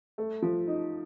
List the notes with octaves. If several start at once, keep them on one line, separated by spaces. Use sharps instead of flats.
A3
F3
D#4